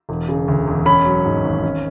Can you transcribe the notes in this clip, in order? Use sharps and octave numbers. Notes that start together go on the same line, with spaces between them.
E1
C#3
D2
E1
C#4 B5
F#3
G#2
G#1
C#4